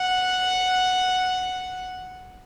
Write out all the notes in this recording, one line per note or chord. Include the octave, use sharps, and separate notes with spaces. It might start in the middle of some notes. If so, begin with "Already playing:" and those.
Already playing: F#5